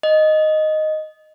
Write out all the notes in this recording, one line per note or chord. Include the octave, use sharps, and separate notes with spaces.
D#5